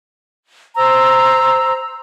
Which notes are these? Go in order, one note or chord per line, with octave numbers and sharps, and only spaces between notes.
C5 A#5 E6